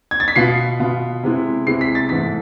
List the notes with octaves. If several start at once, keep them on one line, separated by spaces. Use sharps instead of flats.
G#6
A6
B6
B2 B3 F4 C7
B2 B3 F4
C3 G#3 B3 E4
C3 G#3 B3 E4 C7
B6
A6
G#2 E3 A3 B6